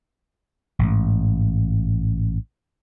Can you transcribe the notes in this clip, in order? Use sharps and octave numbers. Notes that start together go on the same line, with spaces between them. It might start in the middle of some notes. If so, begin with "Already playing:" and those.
A1 G#2